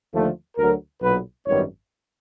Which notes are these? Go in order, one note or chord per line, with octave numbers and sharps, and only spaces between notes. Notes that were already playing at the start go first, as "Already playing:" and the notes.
D#2 D3 F3 A3
D2 D3 F#3 A#4
B1 A#2 F#3 B3 B4
G#1 F#2 D#3 G3 B3 C#5